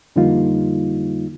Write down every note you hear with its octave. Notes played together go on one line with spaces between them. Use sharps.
F2 D3 G3 A#3 D#4 F4